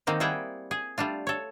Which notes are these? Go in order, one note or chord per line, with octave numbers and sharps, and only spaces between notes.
D#3 A#3 C4 D#4
G3 A#3 E4 G#4 F#5 G5
G#4
G3 A3 D4 F4
A4 C#5